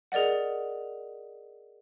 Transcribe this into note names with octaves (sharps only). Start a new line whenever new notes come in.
G#4 A#4 D5 D#5 F#5